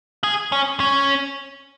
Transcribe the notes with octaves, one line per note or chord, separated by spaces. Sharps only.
G#4
C#4
C#4